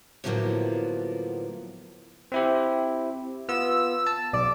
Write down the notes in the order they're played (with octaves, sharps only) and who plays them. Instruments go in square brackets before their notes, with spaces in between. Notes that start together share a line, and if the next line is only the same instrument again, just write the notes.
[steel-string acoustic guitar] A2 D3 F3 F#3 A#3 B3
[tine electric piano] C4 E4 G4
[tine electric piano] B3 F4 [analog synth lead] E6
[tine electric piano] A5
[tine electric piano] B1 [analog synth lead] D5